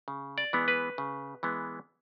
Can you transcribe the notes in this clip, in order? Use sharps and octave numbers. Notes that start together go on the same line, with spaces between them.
C#3
D5
E3 G#3 B3
B4
C#3
E3 G#3 B3